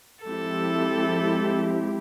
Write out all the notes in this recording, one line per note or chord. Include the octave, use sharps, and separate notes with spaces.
F3 G#3 C4 E4 G4 A4